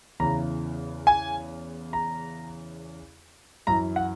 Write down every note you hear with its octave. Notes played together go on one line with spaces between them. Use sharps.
E2 C#3 E3 A#5
G#5
A#5
F#2 E3 A#5
F#5